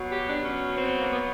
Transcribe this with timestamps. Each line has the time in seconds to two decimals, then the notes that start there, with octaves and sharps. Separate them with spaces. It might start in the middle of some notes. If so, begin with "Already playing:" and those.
Already playing: B2 F#3
0.11 G4
0.28 D4
0.44 C#4
0.76 C4
0.98 A#3
1.10 B3